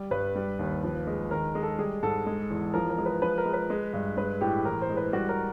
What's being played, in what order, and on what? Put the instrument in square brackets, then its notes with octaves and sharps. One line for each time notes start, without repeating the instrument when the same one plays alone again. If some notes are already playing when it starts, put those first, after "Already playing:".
Already playing: [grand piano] G3
G2 B4
G3
D#2
F3
G#3
D#3 A#4
G#3
A4
G3 G#4
G#2 A4
G#3
E2
F3 A#4
A#4
G#3
B4
F3 B4
A#4
G#3
B4
G#3
G2
G#3 B4
A2 G4
E3 A#4
C5
G#3
B4
G3 F#4
A#4